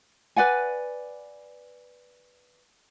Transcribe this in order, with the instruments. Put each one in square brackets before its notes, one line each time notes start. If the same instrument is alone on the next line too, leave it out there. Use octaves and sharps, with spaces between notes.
[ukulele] B4 D5 F#5 G#5